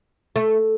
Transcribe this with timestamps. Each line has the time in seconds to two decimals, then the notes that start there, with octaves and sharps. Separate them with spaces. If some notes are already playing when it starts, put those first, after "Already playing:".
0.36 A3